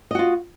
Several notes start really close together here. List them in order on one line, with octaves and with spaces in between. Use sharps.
D#5 F#4 F4